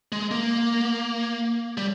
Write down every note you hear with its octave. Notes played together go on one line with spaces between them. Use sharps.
G#3
A#3
G3